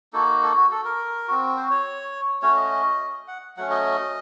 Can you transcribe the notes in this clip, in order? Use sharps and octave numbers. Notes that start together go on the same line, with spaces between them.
A#3 D#4 F#4 A4
A4
F#4
A4
A#4
C4 F#4
C5
C#5
A3 C#4 F#4 C#5
D#5
F#5
F#3 A3 C#4 F#5
D#5